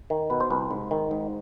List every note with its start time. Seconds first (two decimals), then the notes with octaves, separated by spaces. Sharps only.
0.10 D#3
0.30 B2 B4
0.40 C5
0.50 C2 B4
0.71 G#2
0.91 D#3
1.11 G#2